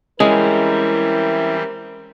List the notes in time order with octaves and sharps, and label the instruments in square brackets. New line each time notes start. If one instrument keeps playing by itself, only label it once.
[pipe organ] E3 G3 C4 [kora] G#3 [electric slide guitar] C#4 E4 [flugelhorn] A#4